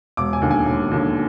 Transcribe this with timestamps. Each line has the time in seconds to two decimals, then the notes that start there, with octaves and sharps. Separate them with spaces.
0.17 E1 D6
0.33 G#5
0.42 D#2 D3
0.51 G#5
0.66 E1
0.91 D#2 D3